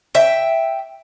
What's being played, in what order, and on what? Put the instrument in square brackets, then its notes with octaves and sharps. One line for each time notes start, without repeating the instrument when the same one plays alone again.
[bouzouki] E5 G5